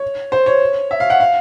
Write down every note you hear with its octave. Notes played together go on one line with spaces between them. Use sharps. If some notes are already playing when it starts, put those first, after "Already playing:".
Already playing: C#5
C5
C#5
E5
F5
F#5
F5